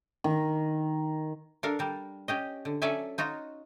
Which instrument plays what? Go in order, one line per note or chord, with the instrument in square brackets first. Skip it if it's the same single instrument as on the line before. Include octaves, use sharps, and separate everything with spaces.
[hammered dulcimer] D#3
[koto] D4 A4 A#4 F5
G3 A#4
C#4 G4 D#5
D3
F#3 C#4 A4 D5 E5 G#5
D#4 F4 F#4 A#5